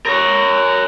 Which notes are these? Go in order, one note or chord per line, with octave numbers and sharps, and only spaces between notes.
A#4 C#5